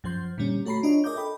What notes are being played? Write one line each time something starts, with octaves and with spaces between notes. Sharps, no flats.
F#2 F3 C5 C6 G6
A#2 D3 G3 C#4
A3 F#4 C#5 A#5 B5 C7
D4 F4 C#5 D#5
G#4 A#4 D#5 A#5 D6 G6
A4 D#5 G5 B5